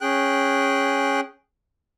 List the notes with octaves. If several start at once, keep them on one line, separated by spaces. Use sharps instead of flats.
C#4 G#4 G5 F#6